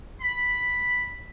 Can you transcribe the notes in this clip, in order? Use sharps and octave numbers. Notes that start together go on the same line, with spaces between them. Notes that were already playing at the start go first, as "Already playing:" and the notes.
B5